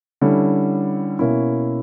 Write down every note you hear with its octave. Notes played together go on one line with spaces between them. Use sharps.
D3 G3 C#4 E4
B2 A#3 C#4 E4